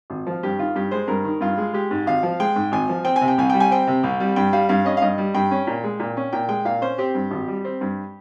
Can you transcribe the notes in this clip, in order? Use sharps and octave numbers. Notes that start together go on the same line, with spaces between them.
G#1
F3
G2 G4
D#3 F4
G2 G4
G#3 C5
G2 A#4
D#3
G2 F4
G#3
G#3 G4
G#2
G#1 F5
F3
G#3 G5
G#2
G#1 G#5
F3
C4 G5
G#5
C3
G5
C2 G#5
G3 G5
G#5
C4 G5
C3
C2
G3
G2 G5
G3 F5
G2 F5
C#4 D#5
F5
G2 D#5
G3
G2 G5
C#4
A#2
G#3
A#2
C#4
A#2 G5
G#3 G5
A#2 F5
C#4 C5
C4 G4
G2
G#1
G3
C4
G2